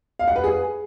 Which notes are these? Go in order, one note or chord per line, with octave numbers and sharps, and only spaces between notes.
F5
F#5
B4
G#4